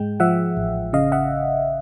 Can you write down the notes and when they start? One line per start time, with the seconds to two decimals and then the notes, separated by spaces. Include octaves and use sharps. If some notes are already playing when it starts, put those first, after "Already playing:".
Already playing: G#2 G#3 G5
0.20 F3 E5 F#5
0.57 A1
0.93 C#3 D#5 F5
1.12 E5 F#5